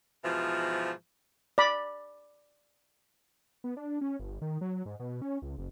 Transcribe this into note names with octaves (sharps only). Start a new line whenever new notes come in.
G#2 B2 E3 F3
D5 B5
B3
D4
C#4
G1
D#3
F#3
G#2
B2
C#4
C#2
F#1